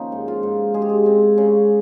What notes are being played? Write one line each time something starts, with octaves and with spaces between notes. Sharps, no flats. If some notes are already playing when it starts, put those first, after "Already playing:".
Already playing: D#3 F3 A#3 C#4 D#4
G#2
F4
G#2
G#3 G#4
G4
G#4
C4
C#3